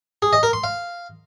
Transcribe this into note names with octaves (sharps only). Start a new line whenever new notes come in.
G#4
D#5
A#4
C6
F5